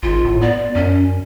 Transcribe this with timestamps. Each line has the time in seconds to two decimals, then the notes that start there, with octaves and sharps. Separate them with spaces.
0.03 G#1 F4
0.25 A2
0.41 B3 D5
0.75 F#2 C#4